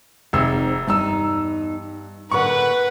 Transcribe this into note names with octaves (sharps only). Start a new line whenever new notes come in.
F1 G#3 C4 D#4 E6
E2 G2 D#4 E6
A2 D3 A#3 B4 F#5 C#6